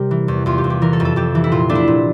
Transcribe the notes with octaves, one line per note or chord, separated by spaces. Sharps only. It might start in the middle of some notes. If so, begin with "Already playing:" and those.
Already playing: C3 G3 G4 A#4
E3
E2
E2 F4
G4
E2
G4
E3 A#4
A4
F2
A4
F2 G4
E3
E4
A#2 F4
A3 D4
E4
A#2